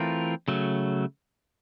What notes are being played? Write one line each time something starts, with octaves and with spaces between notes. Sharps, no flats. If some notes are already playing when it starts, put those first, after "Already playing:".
Already playing: E3 A3 C4 F4 A#4
C#3 F#3 A3